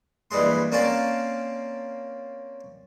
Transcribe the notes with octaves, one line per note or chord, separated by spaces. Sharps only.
A#1 E3 G3 G#3 C6
A#3 C4 C#4 D5 F5 A5